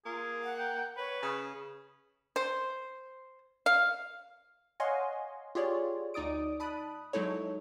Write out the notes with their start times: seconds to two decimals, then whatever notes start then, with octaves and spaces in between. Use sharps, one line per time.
0.06 A#3 F4 G#4
0.43 F#5
0.59 G5
0.97 B4 C#5
1.22 C#3 D#6
2.36 C5
3.66 F5
4.80 C#5 D#5 F5 F#5 G#5 C6
5.55 F4 G4 G#4 C#5 D5
6.14 D2 D#4 D5 D#6 D7
6.60 A5 B5 D#6 F#6
7.13 F#3 G#3 D#4 E4 A4 C#5